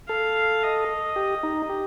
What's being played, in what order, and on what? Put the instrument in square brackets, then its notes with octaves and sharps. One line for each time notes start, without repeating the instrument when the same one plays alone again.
[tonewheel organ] A4 [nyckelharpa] F5
[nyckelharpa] D#5
[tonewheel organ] G4
D#4
G4